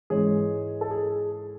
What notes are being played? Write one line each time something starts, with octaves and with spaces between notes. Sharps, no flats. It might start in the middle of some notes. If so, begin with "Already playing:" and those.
G#2 E3 G#3 C#4 G#4
A4
G#4